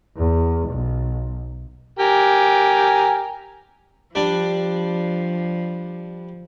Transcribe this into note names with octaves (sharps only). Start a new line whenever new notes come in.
E2
B1
G4 A#4 G#5
F3 G3 D4